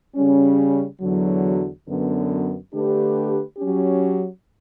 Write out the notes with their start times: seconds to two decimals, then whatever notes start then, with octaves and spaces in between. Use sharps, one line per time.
0.15 C#3 G3 C#4
1.01 E2 D3 F#3
1.86 F#2 D3 F#3 B3
2.72 D3 A3 D4 G4 B4
3.58 F#3 C#4 G4